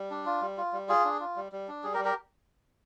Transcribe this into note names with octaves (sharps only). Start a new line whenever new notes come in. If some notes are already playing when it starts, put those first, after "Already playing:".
Already playing: G3
D4
F4
G3
F4
G3
F4 G#4
D4
F4
G3
G3
D4
G3 G#4
G4 A#4
G3
G4 A#4